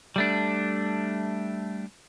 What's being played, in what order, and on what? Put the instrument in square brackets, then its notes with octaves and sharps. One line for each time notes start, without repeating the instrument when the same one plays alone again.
[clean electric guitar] G3 A3 D4